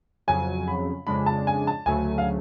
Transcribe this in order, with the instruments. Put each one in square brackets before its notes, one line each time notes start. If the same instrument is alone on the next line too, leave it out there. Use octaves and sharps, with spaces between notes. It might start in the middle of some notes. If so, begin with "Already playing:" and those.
[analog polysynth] F2 C#3 F#3 [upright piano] G#5
[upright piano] B5
[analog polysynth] F2 C#3 G#3 D4 [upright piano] B5
[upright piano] A5
G#5
A5
[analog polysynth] D2 C#3 F#3 A3 [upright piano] G#5
[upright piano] F5